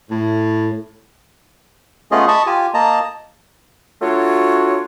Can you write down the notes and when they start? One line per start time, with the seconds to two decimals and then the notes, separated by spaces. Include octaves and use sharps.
0.11 A2
2.11 A3 B3 C#4 F4 G#4 D#5
2.28 D#5 A5 B5 C#6
2.47 F4 G4 G#5
2.74 A#3 D#5 A5 A#5
4.02 F#3 A3 D4 F4 F#4 C#5